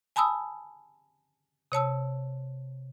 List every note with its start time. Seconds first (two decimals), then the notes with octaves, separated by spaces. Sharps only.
0.16 G#5 A5 B5 D#6 E6
1.72 C3 C#5 A5 E6